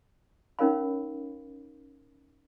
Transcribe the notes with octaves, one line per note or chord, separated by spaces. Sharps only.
C#4 D#4 A#4 C#5 F5 B5